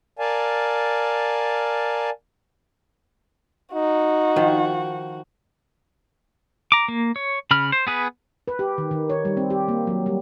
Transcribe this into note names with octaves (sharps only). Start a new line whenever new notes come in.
A#4 D5 F5 G#5 A5
D#4 F#4
D#3 F3
A#5 D6
A#3
C#5
C#3 B5 F6
C5
B3 G#4 B4
B4
G4
D#3
D#3
C#5
G3
C4
G4
A#3
F#3
G3